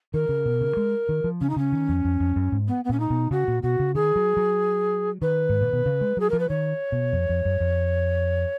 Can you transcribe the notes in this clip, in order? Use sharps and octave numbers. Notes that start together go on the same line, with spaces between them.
D#3 A#4
C#3
B2
C#3
G#3
D#3
F3
C#3 C#4
D#4
C#3 C#4
D#3
F2
F2
F2
F#2
G#2
B3
B3
A#2 C#4
D#4
B2
C#3 F#4
A#2
B2 F#4
C#3
D#3 G#4
F#3
F#3
D#3 B4
G#2
A#2
B2
C#3
G#3
F#3 G#4
F3 A#4
B4
D#3 C#5
B2
F2
F2
F#2
F2